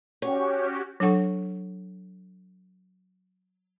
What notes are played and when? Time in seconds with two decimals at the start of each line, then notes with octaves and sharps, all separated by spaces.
0.22 C#4 F#4 G4 C#5
1.00 F#3 D4 A4 F#5 C#6